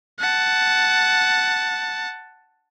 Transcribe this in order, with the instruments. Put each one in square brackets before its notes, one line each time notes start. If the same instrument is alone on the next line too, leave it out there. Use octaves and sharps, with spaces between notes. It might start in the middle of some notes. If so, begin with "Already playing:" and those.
[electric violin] F#5 A5